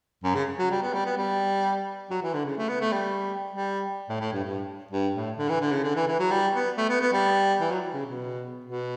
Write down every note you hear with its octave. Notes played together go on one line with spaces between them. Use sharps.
F#2
C#3
F#3
G3
B3
G3
B3
G3
F#3
E3
D3
C#3
A3
B3
A3
G3
G3
A2
A2
G2
G2
G2
A2
D3
E3
D3
C#3
D3
E3
E3
F#3
G3
B3
A3
B3
B3
G3
E3
F#3
C#3
B2
B2